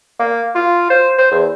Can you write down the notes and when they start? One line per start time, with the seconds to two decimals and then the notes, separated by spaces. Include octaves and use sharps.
0.19 A#3
0.55 F4
0.90 C5
1.18 C5
1.31 E2